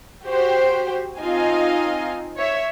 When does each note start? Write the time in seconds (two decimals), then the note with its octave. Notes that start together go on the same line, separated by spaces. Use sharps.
0.23 F#4 G4 C5
1.19 C4 D#4 F4 D#5 F5 G#5
2.36 C#5 E5